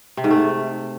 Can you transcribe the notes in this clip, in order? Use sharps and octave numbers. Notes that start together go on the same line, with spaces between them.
C3
G#2
A3